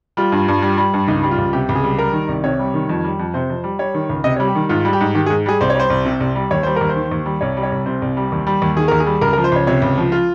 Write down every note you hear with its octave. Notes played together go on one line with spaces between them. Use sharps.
G3 F4
G2
G2
G3
G3
G2
C#2 D#4
G3
F4
C#2
C3 G4
C#2
G#4
G3
G3 A#4
D#3
C2
C3 C#5
G3
D#3
F2
G3
F2
C3 C5
F2
G3
G3 C#5
D#3
C#2
C3 D#5
C#5
G3
G4
D#3
G#2 F4
G3
G4
G#2
D#3 G4
G#4
G#2
G3 G#4
C2 C5
C#5
G3 C5
C2
C3
C2
G3
D#2 C#5
G3 C5
D#2 A#4
C5
D#3
D#2
G3
C2 C#5
G3
C#5
C2
C3 C5
C2
G3
D#2
G3
D#2
D#3 G#4
D#2 A#4
G#4
G3
C#2 A#4
A#4
F3
C5
C#2 C#5
C3 C#5
C#2
F3
F4